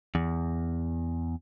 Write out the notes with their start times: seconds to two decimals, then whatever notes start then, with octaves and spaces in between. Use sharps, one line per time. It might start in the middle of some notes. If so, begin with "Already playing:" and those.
0.15 E2